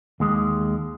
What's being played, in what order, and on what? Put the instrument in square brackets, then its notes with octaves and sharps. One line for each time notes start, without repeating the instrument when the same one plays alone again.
[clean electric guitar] D#2 G#3